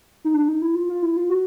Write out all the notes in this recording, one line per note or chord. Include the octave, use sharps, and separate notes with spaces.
D#4
D4
D#4
E4
F4
F4
E4
F4
F#4